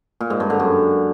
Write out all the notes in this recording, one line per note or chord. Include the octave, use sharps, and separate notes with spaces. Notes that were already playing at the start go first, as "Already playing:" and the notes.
A#2
G#2
G2
D3
F#2